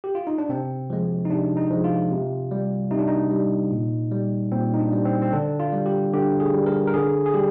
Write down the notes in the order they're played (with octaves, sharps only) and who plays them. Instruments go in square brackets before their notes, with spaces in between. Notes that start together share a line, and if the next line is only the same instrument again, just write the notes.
[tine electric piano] G4
F4
D#4
D4
C3 C4
F3 G#3
D#4
C3 D4
D#4
F3 G#3
F4
C3
G3
C3 D#4
D4
D#4
G3
A#2
G3
A#2 C4
D#4
D4
G3
C4
C4
D3 D4
F4
G3
G4
D3 G4
G#4
G3
A#4
A#4
D3 G#4
G#4
G3 G4